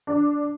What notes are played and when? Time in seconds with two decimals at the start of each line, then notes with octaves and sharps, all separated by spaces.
0.07 D4